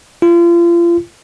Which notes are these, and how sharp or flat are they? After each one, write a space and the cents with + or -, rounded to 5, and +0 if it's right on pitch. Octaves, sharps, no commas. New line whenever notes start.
F4 -35